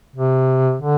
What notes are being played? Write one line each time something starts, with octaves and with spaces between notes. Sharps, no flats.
C3
D3